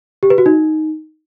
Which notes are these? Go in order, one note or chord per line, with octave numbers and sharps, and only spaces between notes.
G4
B4
F#4
D#4